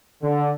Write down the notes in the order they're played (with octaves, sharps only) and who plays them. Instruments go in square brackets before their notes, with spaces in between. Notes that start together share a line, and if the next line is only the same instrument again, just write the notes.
[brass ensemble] D3